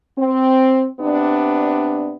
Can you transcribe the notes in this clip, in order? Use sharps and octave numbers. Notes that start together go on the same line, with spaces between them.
C4
C3 B3 D4